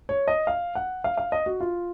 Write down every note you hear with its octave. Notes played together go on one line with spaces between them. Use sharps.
C#5
D#5
F5
F#5
F5
F5
D#5
F#4
F4